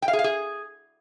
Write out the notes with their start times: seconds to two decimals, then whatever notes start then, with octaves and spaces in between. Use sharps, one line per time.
0.02 G5
0.08 F5
0.13 G#4
0.19 F5
0.24 G#4